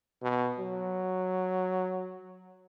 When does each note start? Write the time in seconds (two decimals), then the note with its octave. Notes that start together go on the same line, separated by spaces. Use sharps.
0.23 B2
0.59 F#3